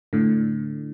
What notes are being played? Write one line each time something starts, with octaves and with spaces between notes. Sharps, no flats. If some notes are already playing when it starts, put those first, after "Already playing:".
A2 D3